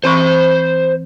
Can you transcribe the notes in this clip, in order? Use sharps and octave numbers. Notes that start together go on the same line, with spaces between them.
E3 C4 C5 B5 C#6